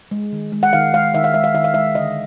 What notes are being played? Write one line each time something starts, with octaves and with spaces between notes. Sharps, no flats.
G#3
D#3
G#3
F#5
D#3 F5
G#3 F5
D#3 E5
F5
G#3 E5
F5
D#3 E5
F5
G#3 E5
D3 D#5